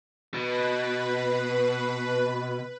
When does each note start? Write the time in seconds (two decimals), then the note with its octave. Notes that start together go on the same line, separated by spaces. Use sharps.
0.34 B2 B4